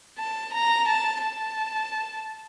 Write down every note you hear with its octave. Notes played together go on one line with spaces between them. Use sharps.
A5
A#5
A5
A5